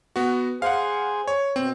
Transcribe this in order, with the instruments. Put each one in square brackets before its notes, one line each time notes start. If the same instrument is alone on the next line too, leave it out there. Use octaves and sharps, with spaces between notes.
[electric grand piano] B3 F#4
[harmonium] G#4 C5 G#5 [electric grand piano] F5 F#5
[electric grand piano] C#5
[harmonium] B2 [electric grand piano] C4